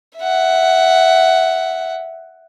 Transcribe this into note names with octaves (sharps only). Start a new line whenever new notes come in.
E5 F#5